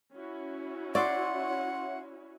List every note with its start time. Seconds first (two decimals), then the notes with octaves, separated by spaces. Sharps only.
0.13 C#4 E4 F#4
0.95 C#5 D5 E5 F#5 C6